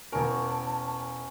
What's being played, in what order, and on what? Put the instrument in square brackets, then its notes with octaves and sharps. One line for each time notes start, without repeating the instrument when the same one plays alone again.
[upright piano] E1 A#4 [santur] C#4 [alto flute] A5